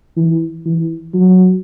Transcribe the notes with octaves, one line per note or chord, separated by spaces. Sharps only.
E3
E3
F#3